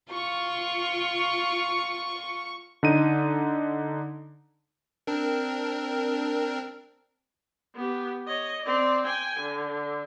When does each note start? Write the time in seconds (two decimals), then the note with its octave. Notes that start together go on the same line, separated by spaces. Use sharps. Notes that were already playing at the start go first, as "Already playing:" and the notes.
0.12 F4 C#6
2.83 D3 D#4 D#7
5.07 C4 D4 A#4
7.75 B3 G4
8.27 C#5 D#5
8.62 C4 D5
9.06 G5 G#5
9.40 D3